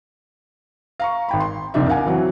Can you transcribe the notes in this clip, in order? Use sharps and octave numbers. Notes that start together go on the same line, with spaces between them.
F5 A#5 C#6
G#1 G5 B5
C6
F#1 C2 F2 D4 D#4 E5
A#4 F5 F#5 G#5
E3 F#3 C4